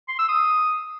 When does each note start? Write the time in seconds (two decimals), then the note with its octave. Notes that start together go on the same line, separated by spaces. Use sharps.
0.08 C6
0.19 E6
0.29 D#6